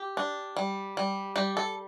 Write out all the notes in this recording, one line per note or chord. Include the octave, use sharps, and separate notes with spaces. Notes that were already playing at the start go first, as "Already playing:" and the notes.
Already playing: G4
D4
G3
G3
G3 G4
A4